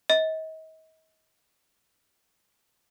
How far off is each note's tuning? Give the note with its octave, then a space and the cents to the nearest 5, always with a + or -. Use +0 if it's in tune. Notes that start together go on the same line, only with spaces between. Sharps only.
D#5 +40